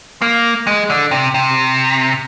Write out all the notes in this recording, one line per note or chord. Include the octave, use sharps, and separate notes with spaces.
A#3
G#3
D3
C3
C3